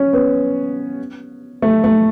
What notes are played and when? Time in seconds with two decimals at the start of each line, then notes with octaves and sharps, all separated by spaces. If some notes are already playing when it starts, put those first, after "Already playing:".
Already playing: C#4
0.13 B3
1.62 A3
1.84 A3